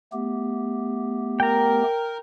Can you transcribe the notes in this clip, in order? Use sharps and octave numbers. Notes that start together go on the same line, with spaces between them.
A3 B3 G4
A#4 G5 A#5